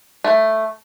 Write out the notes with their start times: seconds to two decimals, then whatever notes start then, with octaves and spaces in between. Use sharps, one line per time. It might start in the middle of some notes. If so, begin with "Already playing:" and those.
0.24 A3